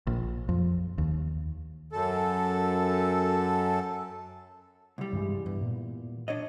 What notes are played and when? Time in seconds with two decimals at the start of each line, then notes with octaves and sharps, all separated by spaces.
0.07 A#1
0.49 F2
0.98 D#2
1.93 F#2 A4
4.98 C2 G3
5.13 G2 E3 G#3
5.46 E2 G2
5.61 A#2
6.28 D4 C#5 D#5